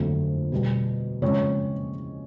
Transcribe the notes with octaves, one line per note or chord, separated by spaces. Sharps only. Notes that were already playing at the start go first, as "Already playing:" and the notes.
Already playing: F2 D3 F#3 A3 C4
B2 G3 B3
C#3 F3 G#3 C4 C#5